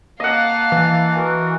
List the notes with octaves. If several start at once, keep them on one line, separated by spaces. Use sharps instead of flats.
A#3 D#5 F5 F#5 A5
E3
F#4 A#4